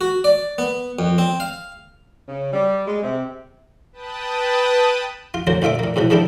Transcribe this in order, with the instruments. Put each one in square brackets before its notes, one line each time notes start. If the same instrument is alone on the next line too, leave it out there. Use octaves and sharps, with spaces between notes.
[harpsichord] F#4
D5
B3
F2
C4
F5
[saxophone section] C#3
G3
G#3
C3
[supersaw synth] B4 G5 A5 B5 D#6
[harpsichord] F4
D2 F#3 A#3 C5
D2 A#2 F4 E5 D6
A#2 A#3
G#2 B2 E3 F3
G#2 D#3 G3 D4 E4 G4